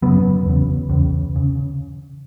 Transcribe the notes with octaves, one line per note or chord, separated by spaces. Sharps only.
F#2 C#3 F#3 B3
E2 C#3
E2 C#3
C#3